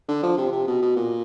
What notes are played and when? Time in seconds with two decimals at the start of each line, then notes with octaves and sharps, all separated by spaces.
0.08 D3
0.23 F3
0.37 C3
0.52 C3
0.67 B2
0.82 B2
0.96 A#2